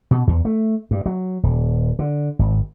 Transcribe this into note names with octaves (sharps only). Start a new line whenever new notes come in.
B2
E2
A3
G2
F#3
D#1
D3
G#1